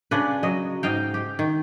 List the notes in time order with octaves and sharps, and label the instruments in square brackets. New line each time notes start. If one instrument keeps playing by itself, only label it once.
[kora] C#3 D4 B4
F#3 D#5
G#2 D#5 F5 G5
G4
D#3